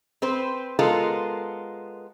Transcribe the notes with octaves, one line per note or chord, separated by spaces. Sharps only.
C4 B4 C5
G#3 B3 F4 A4 A#4